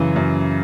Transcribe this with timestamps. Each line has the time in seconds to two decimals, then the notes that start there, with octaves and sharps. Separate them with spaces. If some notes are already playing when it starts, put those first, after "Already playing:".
Already playing: F#2 C#3 E3
0.16 F#2